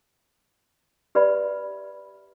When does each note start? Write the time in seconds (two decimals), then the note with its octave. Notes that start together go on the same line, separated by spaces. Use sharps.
1.15 G4 B4 D5 E5 B5